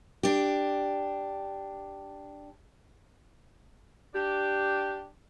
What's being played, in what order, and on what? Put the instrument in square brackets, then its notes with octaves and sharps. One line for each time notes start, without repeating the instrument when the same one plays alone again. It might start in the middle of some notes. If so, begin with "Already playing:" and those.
[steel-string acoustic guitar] D4 G4
[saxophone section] D4 G4